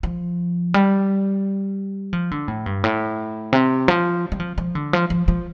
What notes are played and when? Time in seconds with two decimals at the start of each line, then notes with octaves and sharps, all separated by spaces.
0.03 F3
0.74 G3
2.13 F3
2.31 D3
2.48 A2
2.66 G2
2.84 A2
3.53 C3
3.88 F3
4.32 G3
4.40 F3
4.58 F3
4.75 D3
4.93 F3
5.10 F3
5.28 F3